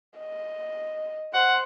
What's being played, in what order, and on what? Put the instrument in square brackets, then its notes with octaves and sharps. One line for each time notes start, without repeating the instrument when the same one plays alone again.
[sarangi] D#5
[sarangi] C5 [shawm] F#5